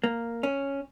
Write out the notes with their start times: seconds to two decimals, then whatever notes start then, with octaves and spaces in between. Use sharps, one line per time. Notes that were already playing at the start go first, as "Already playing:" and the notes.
0.04 A#3
0.43 C#4